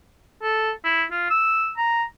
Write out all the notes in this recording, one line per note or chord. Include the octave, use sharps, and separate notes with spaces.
A4
E4
F4
E6
A#5